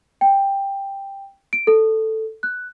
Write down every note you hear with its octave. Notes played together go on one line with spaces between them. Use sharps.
G5
D7
A4
F#6